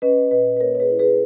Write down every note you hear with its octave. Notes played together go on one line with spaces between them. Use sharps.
C#4 B4 D#5
A#2 B4 D#5
B4
A#3 A#4 C#5
C#5
G#4 B4
E4
G#4 B4